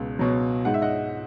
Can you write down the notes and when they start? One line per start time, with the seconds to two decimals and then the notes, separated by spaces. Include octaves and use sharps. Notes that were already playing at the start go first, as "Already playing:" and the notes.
Already playing: C#2 B2
0.19 B2 F#3
0.65 G#2 F#5
0.74 E5
0.82 D#5 F#5